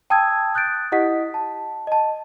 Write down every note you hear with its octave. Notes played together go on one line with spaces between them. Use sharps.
G5 A5 D#6 E6 G#6
D#6 F#6 G6 A6 D7
E4 G4 D#5 F#5 D#6 B6
A5
D#5 A5